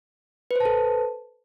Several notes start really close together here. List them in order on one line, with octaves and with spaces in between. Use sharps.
B4 C5 A5 A4